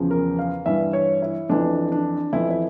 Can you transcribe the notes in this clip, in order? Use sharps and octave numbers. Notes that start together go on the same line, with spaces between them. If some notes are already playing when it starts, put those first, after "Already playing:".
Already playing: E2 C#3 F3
A#4
F5
G2 E3 E5
C#5
E4
F2 E3 D4
D4
F2 E3 E4
E4